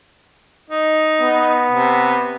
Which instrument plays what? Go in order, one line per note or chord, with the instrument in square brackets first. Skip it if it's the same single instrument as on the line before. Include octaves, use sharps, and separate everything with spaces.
[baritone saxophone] D#4
[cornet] B3
[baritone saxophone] C3